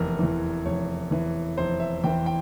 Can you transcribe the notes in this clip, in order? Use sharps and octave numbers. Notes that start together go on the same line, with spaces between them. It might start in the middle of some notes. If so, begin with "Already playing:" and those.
Already playing: F1 E2 E3 A#4
E2 E3
F1 C#5
E2 E3
F1 C5
E5
E2 E3 G5
G5